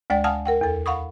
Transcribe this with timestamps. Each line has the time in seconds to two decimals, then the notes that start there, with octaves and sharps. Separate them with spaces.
0.10 D2 G#3 D5 G5 A6
0.24 F5 F#5 G#5 A5 D#6 F6
0.46 A#4 F#5 G5
0.61 E2 A4
0.86 F5 F#5 B5 C#6 D#6